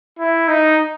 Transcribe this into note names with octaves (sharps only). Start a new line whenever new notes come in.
E4
D#4